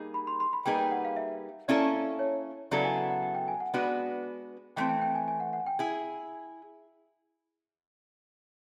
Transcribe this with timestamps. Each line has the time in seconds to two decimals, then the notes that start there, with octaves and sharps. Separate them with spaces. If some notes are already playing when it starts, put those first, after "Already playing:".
Already playing: G3 A#3 D#4 G#4
0.14 B5
0.27 C6
0.40 C6
0.53 B5
0.65 G3 A#3 D#4 G#4 B4 G5
0.79 G5
0.91 F#5
1.05 F5
1.16 E5
1.68 A#3 C#4 E4 A4 D5
2.19 C#5
2.71 C#3 F#3 B3 E4 A4 D5
2.84 G#5
2.96 F#5
3.10 F#5
3.23 F#5
3.35 G5
3.48 G#5
3.60 F#5
3.74 G#3 B3 D4 F#4 B4
4.76 E3 A3 C4 G5
4.89 G5
5.02 G5
5.15 G#5
5.28 G#5
5.40 F#5
5.53 F#5
5.66 G5
5.79 E4 G#4 G#5